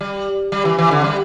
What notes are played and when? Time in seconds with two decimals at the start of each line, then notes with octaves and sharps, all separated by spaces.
0.01 G3
0.52 G3
0.65 E3
0.78 E3
0.91 D3
1.04 G3